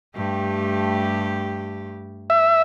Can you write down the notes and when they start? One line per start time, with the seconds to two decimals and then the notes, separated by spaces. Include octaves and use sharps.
0.15 G2 A3 G4
2.30 E5